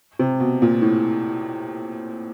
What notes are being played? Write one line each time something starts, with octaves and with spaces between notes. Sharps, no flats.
C3
B2
A#2
A2